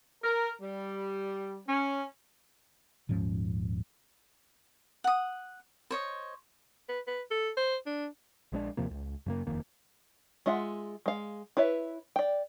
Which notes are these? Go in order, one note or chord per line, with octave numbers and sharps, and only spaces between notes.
A#4
G3
C#4
D#1 G#2 F3 C#4
F#5 D#6
C5 C#5 D#5
B4
B4
A4
C5
D4
A#1 G#3 C4 D4
D#2 C3 F3 A#3
C#2
F#2 C#3 A#3
D#1 F2 D#3 A#3
G#3 F4 E5 F#5
G#3 F5
E4 B4 C#5 E5
D5 G5